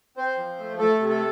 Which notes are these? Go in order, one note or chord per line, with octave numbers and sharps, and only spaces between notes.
C4 C5
F3
A3
A3 A4
C3
A4